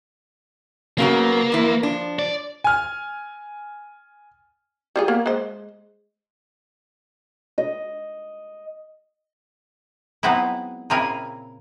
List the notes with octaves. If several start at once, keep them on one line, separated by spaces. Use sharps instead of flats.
C#3 F#3 A#3 B3
F2 E3
F3 D4
D5
G#5 F6
G3 F4 G#4
A#3 B3
G#3 C5
D#5
F#3 G#3 B3 C4 D#4 E4
A#2 C#3 C4 E4 A#4 G#5